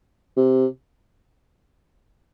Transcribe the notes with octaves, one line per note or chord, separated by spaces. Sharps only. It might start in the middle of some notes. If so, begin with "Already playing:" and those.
C3